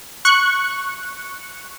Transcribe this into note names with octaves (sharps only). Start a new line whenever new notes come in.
C#6 F#6 C#7